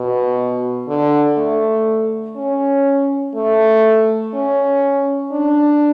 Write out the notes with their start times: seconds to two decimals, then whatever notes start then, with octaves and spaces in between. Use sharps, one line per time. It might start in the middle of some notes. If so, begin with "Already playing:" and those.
Already playing: B2
0.88 D3
1.37 A3
2.36 C#4
3.35 A3
4.34 C#4
5.31 D4